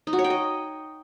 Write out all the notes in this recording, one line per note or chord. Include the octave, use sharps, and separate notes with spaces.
D#4
F#4
C#5
G5
D#5